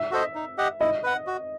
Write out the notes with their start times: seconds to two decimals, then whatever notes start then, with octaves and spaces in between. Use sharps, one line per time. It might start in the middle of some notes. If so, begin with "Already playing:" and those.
Already playing: E5
0.11 F#4 A4 C5 D#5
0.35 D#4
0.58 G4 D#5 F#5
0.80 E4 D#5
1.03 B4 F#5
1.27 F#4